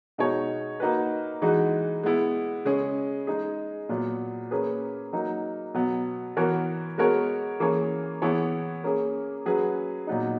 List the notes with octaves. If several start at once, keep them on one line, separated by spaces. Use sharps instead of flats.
B2 G#3 D#4 F#4 C#5
A#3 D#4 F#4 B4
E3 G#3 D#4 F#4
G#3 B3 E4
C#3 G#3 C#4 G#4
G#3 D#4 G#4
A#2 F#3 B3
A#3 C#4 G#4 B4
F#3 A#3 D#4
B2 F#3 B3
E3 B3 F#4 A#4 C#5
G#3 B3 F#4 A#4 C#5
E3 A#3 C#4 G#4 C#5
E3 B3 E4 G#4 C#5
A#3 C#4 G#4
F#3 C#4 G#4 B4
A#2 F#3 B3 D#4